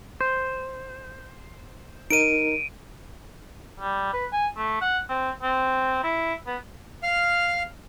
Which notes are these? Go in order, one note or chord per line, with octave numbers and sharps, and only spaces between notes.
C5
D#4 A#4 D#5 D7 D#7
G3
B4
G#5
A3
F#5
C4
C4
E4
B3
F5 F6